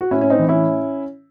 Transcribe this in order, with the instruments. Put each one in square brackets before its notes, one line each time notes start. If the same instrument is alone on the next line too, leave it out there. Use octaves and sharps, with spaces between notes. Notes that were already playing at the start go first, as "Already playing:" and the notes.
[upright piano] F#4
A2 C#4 E4
C#4
C4 D#4
E3
C#4 E4